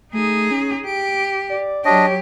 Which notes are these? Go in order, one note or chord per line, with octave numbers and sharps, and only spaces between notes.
A3 D#4 G#4
C#4
G4 D7
D5
F#3 D4 G4 C#5 D#5